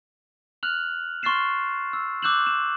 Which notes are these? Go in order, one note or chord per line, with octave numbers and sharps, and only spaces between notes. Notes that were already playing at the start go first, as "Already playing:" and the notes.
F6 F#6 F7 F#7
C6 C#6 F6 A6 C7 E7
E6
D6 E6 F#6 G6 E7 F#7
E7